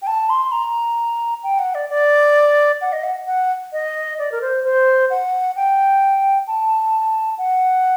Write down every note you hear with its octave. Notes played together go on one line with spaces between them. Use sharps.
G5
A5
C6
A#5
G5
F#5
D5
D5
F#5
D#5
F#5
F#5
D#5
D5
A#4
C5
C5
F#5
G5
A5
F#5